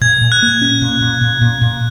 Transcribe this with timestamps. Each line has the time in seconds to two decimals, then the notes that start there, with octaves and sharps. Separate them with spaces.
0.01 A#2 G#6
0.22 A#2
0.32 F#6
0.42 A#3
0.62 C#4
0.82 A#2
1.01 A#2
1.21 A#2
1.42 A#2
1.62 A#2